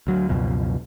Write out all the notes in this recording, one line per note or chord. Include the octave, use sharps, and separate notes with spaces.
D2 F#3
C#2 F#2 B2 F3